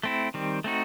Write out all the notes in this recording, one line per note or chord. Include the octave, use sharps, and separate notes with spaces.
A3 C4 E4
D#3 G3 C4
A3 C4 D#4 F#4